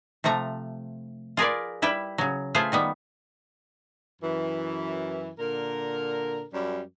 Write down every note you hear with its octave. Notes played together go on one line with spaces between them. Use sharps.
C3 F3 A3 A#5
F4 G#4 A#4 B4 D5
G3 E4 B4 G5
C#3 F#3
A3 F4 G#4 B4 C5
D#3 G3 B3
F#2 E3
A#2 D3 A#4
F#2 G3